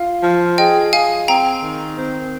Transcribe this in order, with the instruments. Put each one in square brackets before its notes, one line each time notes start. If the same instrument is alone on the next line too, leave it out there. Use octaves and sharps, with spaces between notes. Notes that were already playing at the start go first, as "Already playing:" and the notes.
Already playing: [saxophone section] F4 [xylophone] F5
[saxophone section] F3
[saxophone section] G#4 [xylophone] D#5 G5
[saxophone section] G#4 [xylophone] F5 G#5
[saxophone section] C4 [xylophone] G5 A#5
[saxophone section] D#3
C4